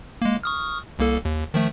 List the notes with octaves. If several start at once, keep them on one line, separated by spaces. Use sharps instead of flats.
G#3 A#3
C#6 D#6 F6
C2 A#3 A4
D#2
D#3 F3 A3